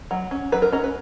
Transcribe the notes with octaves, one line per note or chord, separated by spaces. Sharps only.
F#3
C#4
F#3 B4
A#4
C#4 A#4
B4